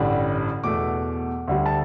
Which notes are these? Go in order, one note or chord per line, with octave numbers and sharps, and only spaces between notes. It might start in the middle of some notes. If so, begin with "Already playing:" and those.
Already playing: A1 G2 D3 G3
E2 B2 A3 D6
D2 D3 G3
A5